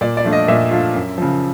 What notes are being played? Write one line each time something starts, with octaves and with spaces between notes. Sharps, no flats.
A#2 D5
D5
F3 A3 D4 F4
D#5
A#2 E5
F3 A3 D4 F4
F#2
C#3 F3